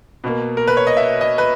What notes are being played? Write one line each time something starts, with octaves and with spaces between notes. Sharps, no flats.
B2 A#3
A#4
B4
C#5
D#5
E5
D#5
B4